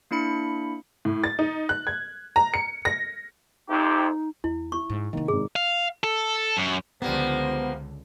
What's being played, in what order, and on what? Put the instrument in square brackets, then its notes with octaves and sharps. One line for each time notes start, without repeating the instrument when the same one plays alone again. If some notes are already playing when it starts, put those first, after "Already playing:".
[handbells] A#3 D4 E4 B5 C#7
[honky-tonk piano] A2
A6
D#4
F#6
G#6
A#5
C#7
A#6
[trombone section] F2 C3 G4 [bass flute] D#4
[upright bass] E2 [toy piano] E4
[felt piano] E4 [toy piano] C#6
[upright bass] G#2
[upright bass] C3 C4 [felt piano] D#3 A#3
[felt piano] G#1 G#2 [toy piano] G#4
[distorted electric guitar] F5
A4
F#2
[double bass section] C#2 D3 [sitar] F3 G3 A#3 [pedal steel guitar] B3 [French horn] C5